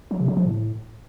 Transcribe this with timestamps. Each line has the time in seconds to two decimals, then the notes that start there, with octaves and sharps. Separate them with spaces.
0.11 F#3
0.19 C3
0.28 F#3
0.37 F3
0.45 A2